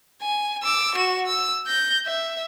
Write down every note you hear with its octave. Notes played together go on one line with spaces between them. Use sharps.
G#5
D6 E6
F#4 E7
E6
G6 A#6
E5